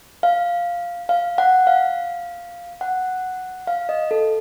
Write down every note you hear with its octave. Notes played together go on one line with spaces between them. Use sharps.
F5
F5
F#5
F5
F#5
F5
D#5
A4